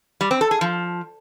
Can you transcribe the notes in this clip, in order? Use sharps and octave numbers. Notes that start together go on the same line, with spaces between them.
G3
C4
A4
G#4
F3